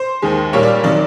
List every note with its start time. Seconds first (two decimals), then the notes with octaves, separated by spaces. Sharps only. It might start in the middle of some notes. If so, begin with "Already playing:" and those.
Already playing: C5
0.22 D#2 D#3 G#3
0.53 A#2 G3 A#3 C#5
0.63 D5
0.83 C3 D#3 F#3 D5